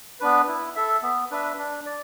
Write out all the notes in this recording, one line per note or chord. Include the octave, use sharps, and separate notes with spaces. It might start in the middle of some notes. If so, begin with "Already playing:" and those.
B3 D4 B4
E4
A4 E5
B3
D4 B4 E5
D4
D5